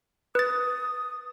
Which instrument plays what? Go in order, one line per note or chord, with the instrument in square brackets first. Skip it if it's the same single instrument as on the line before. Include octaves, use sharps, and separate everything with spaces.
[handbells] B4 A6 [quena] D#6